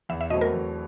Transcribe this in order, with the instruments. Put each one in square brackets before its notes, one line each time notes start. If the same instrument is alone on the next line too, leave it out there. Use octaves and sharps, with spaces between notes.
[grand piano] E2 [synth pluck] E5
[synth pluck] E5
[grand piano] B2 F#3 A3 C4 [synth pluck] D#5
[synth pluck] A#4
[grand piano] E2